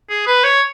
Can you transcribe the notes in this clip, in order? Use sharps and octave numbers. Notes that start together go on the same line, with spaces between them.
G#4
B4
C#5